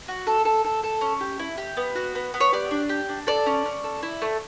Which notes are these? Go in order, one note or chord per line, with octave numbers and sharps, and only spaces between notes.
F#4
A4
A4
A4
A4
C#4
G4
E4
G4
B3
F#4
B3
B3
C#5
G4 D5
D4
G4
D4
A4 D5
C#4
C#4
A4
E4
A3